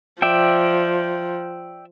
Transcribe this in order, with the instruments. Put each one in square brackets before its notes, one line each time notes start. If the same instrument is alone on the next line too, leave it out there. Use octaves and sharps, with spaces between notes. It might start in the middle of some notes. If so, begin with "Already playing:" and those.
[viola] F3 [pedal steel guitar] D5 E5 G5